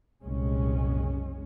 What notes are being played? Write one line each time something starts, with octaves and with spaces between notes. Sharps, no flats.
F#1 C2 A#2 G#3 C#4